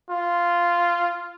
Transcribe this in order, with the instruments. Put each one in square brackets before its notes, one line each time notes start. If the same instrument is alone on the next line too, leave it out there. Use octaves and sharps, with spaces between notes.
[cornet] F4